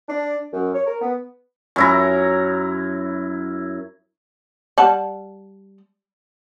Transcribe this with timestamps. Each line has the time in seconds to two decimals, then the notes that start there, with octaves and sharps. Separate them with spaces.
0.09 D4
0.53 F#2
0.74 C#5
0.87 A#4
1.01 B3
1.76 F#2 E4 A#5
4.78 G3 F#5 A5